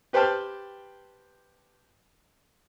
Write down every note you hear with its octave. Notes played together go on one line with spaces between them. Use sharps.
G4 B4 C5 G5 A5 F6